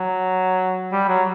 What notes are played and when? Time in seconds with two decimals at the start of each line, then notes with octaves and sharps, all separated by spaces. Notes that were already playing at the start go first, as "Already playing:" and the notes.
Already playing: F#3
0.92 G3
1.08 F#3